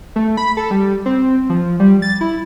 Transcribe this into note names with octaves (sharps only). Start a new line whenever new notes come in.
A3
B5
A4
G3
C4
F3
G3
A6
E4